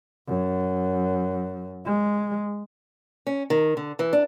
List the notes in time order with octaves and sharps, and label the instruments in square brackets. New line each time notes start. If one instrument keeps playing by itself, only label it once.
[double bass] F#2
G#3
[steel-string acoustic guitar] C#4
D#3
D3
E3
D4